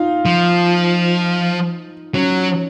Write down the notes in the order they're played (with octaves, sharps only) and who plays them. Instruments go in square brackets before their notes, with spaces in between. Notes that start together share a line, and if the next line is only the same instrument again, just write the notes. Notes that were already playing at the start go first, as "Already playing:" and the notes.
Already playing: [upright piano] D#4 F4
[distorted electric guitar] F3
[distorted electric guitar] F#3 [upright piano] C#4